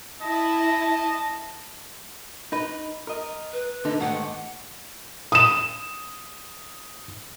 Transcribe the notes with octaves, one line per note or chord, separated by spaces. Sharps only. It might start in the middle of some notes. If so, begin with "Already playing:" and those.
E4 D#5 A5
D#4 B4
A#4 D#5
B4
D3 D#4
D#2 G#2 A3 F#5
D#6 E7